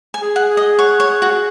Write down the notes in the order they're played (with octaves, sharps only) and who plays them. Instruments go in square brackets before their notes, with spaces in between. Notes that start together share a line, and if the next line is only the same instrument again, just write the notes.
[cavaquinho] G#5
[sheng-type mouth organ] G#4
[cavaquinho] F#5
[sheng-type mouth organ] G#4
[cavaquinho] D#5
[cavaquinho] C#5 [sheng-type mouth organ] F#5
[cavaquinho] C#5
[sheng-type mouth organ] G#4
[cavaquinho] F#4